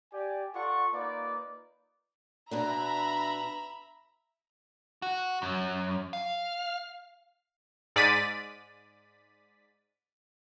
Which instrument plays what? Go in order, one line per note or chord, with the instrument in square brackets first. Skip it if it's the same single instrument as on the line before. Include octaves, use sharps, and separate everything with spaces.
[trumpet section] G4 D5 G#5
F4 A4 D5 F#5 C#6
A#3 D#4 F4 B4 D5 D6
[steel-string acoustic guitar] B2 B3 D4 [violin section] E5 A#5 B5
[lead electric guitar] F#4
F#2
F5
[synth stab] G#2 D5 A6 B6 D#7